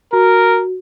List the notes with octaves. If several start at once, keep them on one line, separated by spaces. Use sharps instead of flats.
F#4 A#4